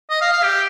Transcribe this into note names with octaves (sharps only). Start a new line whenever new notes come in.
D#5
F5
F5
G4